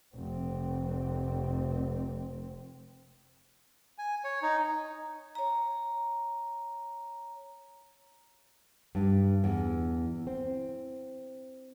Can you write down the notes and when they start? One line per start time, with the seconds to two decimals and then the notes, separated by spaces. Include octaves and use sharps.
0.15 F1 C4
3.98 G#5
4.24 C#5
4.42 D#4
5.35 C#5 A#5
8.95 G2
9.44 E2
10.27 C4